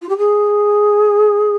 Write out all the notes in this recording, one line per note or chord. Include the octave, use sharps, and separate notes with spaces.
F4
G4
G#4